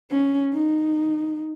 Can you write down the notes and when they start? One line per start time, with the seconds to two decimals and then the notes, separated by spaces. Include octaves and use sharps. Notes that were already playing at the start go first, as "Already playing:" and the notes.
0.11 C#4
0.53 D#4